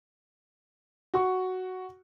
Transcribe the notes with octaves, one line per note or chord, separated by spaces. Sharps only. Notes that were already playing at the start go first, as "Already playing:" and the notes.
F#4 C#6